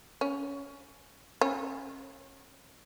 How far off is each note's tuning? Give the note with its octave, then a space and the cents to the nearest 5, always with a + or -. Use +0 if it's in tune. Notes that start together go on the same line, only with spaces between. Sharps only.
C#4 +20
C#4 -25